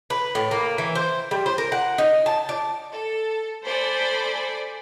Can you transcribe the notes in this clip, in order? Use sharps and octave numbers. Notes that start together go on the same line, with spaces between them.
B4
A2
A#3
E3
C5
G3
C5
A#4
F#5
D#4
A5
D5
A4
A4 C5 D5 G#5 B5